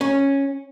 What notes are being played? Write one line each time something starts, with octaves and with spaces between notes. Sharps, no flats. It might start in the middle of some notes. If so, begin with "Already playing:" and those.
C#4